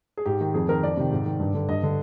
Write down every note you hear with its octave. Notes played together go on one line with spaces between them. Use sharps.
G#4
G#2 G4
D#3
F2 G#4
D#3 A#4
F2 D5
C3 D#3
G#2
D#3
G2
D3
G2 D#5
D3